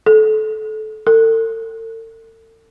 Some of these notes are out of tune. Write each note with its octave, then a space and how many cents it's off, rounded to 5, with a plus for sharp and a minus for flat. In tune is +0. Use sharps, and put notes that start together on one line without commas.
A4 -25
A4 +40